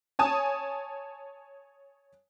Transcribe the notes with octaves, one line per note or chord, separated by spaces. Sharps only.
C#5 G#5 A5 D#6